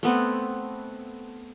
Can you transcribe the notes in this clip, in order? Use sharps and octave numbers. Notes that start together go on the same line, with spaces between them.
A3 B3 C4